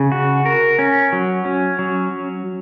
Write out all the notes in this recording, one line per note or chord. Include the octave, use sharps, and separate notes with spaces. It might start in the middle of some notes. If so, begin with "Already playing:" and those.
Already playing: C#3
F#4
A#4
C#4
F#3
C#4
F#3